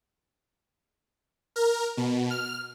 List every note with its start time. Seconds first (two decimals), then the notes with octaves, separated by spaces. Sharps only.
1.56 A#4
1.97 B2
2.30 F6